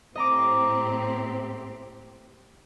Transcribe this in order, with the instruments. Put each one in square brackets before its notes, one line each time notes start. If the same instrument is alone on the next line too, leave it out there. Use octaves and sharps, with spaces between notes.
[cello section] A2 C4 G4 [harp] D#5 A#5 D6